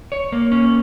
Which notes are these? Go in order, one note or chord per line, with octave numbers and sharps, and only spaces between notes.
C#5
A#3
C#4